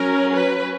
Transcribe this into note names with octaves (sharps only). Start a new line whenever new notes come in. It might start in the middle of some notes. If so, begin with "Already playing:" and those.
Already playing: F#3 C#4 A#4
B4